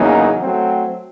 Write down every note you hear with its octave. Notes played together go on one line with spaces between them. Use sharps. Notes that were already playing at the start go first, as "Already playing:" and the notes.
Already playing: E2 C#3 F#3 A#3 D#4
F#3 A3 C4